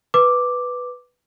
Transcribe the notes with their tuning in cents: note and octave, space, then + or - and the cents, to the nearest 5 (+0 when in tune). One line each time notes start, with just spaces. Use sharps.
B4 +0 D6 +0